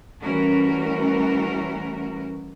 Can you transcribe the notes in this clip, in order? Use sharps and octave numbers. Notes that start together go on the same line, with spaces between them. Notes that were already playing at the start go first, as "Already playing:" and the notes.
E3 G3 A3 C#4 F#4 A#4